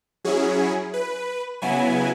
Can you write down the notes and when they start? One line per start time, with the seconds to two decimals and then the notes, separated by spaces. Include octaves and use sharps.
0.24 F#3 C#4 E4 G#4
0.94 B4
1.62 C#3 F#3 B3 E4 G#5